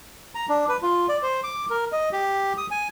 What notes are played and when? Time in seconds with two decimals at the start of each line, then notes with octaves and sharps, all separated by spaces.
0.35 A#5
0.49 D4
0.69 B4
0.82 F4
1.09 D5
1.22 C5
1.44 D6
1.70 A#4
1.92 D#5
2.12 G4
2.58 D#6
2.71 G#5